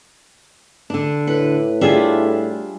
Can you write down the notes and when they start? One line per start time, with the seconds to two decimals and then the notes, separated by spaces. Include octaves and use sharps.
0.90 D3 D4
1.27 A2 B4
1.81 G3 D4 F4 G#4 E5